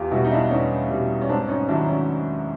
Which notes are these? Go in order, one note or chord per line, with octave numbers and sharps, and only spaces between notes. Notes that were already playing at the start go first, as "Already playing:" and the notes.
Already playing: E2 F4 G4
B2 G3 E4 F#4
D#4
D4 E4
E2 C#4 D#4
B2 G3
C#4
G#2 C4 D4
C#4 D#4
D#3 F#3 D4 E4
C#4